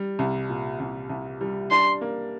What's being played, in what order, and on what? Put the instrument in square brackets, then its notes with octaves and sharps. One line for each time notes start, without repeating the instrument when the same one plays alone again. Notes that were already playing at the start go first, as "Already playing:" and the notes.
Already playing: [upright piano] G3
C2
A#2
C2
C2
G3
[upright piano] D4 [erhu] C6
[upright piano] A#3